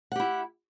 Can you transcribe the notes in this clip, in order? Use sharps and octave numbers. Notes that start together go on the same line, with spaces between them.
E4 G4 F#5